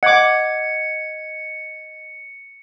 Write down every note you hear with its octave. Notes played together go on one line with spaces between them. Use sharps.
D#5 F#5 D6 G#6 C#7